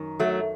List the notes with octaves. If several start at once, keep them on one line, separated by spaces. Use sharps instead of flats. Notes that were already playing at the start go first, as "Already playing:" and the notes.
Already playing: F#2 D#3
F#3 A3